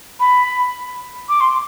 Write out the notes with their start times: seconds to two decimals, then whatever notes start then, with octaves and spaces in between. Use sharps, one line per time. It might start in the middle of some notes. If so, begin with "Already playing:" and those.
0.20 B5
1.29 D6
1.41 C6